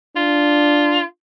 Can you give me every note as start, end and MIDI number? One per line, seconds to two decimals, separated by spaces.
0.16 1.00 62
0.16 1.03 65